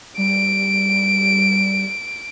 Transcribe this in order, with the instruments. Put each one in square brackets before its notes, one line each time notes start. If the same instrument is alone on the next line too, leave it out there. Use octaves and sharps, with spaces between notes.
[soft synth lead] G3 [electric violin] D7